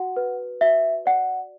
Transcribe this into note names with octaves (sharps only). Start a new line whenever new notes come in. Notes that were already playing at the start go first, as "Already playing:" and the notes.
Already playing: F#4 F#5
B4
F#4 E5
D5 F#5